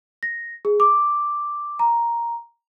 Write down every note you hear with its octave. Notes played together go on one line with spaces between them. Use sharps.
A#6
G#4
D6
A#5